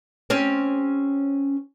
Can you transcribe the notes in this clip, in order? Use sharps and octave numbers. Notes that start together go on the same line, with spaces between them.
C4 C#4 G4